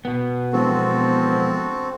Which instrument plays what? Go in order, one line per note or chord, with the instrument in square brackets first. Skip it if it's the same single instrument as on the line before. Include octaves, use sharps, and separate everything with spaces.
[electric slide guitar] B2 B3
[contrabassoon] E1 [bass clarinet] F3 [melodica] C4 F#4 A4